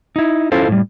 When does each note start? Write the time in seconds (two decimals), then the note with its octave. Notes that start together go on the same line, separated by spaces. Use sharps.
0.16 D#4 E4
0.52 C#4 E4 F4 A4 C5
0.68 A2 G3